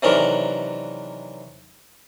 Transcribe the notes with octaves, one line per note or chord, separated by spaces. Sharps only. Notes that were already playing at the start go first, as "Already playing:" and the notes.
C3 D#3 E3 F#3 D4 A#4